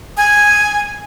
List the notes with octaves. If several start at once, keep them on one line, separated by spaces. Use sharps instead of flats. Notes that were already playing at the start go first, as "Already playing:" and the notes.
G#5